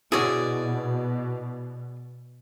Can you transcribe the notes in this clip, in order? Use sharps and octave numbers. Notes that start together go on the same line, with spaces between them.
B2 E4 F#4 G#4 C#5 D5